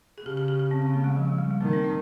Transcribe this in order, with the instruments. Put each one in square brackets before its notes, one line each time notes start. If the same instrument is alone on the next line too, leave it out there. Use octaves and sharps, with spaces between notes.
[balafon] G#4
[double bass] C#3 [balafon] G4
[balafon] G4
G4
G4
C4
C4
A#3
G#3
F3
F3
G3
G3
[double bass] D#3 [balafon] A#3
[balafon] C4
D#4